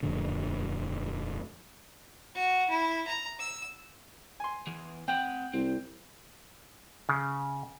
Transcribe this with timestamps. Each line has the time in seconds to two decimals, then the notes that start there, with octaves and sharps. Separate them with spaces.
0.03 D#1 F2 A2 D3
2.35 F#4
2.69 E4
3.07 A#5
3.39 E6
4.40 G#5 C6
4.67 E2 E3
5.08 C4 F#5 G5
5.53 C2 C4
7.09 C#3